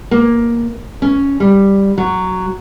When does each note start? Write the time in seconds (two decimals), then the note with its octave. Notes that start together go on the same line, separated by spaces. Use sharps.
0.11 A#3
1.02 C#4
1.40 G3
1.98 F#3